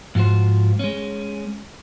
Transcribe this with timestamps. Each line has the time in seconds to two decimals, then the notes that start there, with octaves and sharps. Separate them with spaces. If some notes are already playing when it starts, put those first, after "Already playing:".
0.15 G#2 F3 F4 F#4 C5
0.79 G#3 C#4